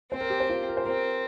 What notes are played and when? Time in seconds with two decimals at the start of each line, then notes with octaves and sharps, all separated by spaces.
0.12 C4 C5
0.21 A#4
0.30 G4
0.40 C5
0.49 F4
0.69 A#4
0.77 C5
0.85 C4 A#4